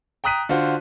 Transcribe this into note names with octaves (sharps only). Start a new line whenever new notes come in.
G5 A#5 D#6 F#6 B6 D#7
D3 F4 F#4 C5